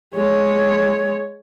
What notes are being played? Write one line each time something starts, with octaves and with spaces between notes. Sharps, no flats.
G#3 C#5